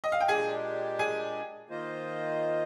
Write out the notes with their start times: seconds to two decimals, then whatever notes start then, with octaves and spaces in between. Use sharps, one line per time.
0.04 D#5
0.12 F5
0.20 G5
0.28 A#2 G#3 D4 G4 G#4 G#5
0.99 G#4 G#5
1.69 D#3 A#3 F4 C5 D#5